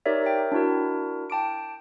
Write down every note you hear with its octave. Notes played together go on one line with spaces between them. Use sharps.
D#4 G4 A#4 C#5 D5 E5
A#4 C#5 E5 G5
D4 E4 F#4 A#4
G5 A5 D6 D7